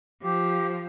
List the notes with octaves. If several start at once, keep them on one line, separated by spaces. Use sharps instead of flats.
F3 G4